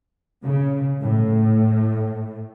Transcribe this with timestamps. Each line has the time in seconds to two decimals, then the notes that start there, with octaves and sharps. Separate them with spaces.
0.44 C#3
1.01 A2